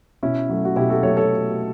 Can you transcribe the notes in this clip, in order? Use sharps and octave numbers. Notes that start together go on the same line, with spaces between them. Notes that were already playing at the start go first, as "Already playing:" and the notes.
B2 C#4 E4
F#3 A3
F#4
B2 E4 G4
F#4 A4
F#3 A3 A4 C#5
A4 C#5